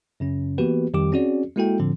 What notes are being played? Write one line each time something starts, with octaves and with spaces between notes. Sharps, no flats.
F#2 C#3 C#4
E3 A#3 B3 F#4 G4 B4
F2 D#3 G3 G4 D6
C4 C#4 F#4 G#4 D5
G#3 A#3 E4 F#4 A4 G5
A2 D3 F3 C4